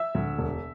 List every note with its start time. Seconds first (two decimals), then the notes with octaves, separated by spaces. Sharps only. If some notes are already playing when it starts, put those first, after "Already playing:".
Already playing: E5 E6
0.15 D2
0.38 E1